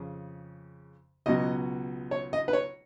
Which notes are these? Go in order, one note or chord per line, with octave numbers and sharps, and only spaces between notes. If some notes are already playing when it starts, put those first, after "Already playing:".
Already playing: F2 C#3
C#2 B2 F#3 D#5
C#5
D#5
B4
C#5